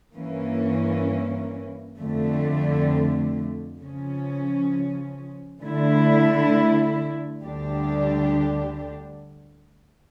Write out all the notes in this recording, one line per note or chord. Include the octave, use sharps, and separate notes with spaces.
G2 E3 A#3 C#4
F2 D3 A3
C#3 F3 C#4
D3 A3 E4
D2 D3 G3 D4 G4